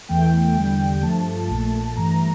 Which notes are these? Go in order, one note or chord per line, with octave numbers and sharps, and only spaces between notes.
E2 E3 A3 G5
E2 D3 G3
G5
G2 F3 A3 A5
A#1 A#2 A3 A5
G2 E3 A3 A#5